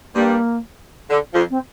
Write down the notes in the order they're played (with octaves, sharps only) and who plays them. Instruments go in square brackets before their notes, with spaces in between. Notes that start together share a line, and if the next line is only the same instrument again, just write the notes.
[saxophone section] G2 G3 [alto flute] A#3
[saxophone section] D3
F2 F3
[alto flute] C4